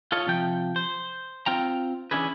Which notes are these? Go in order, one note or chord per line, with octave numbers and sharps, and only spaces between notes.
F4 A4 C#5 D#5
C3 F3 G5
C5
C4 F4 G5 A#5
E3 C#4 D4 E4 G#4 B4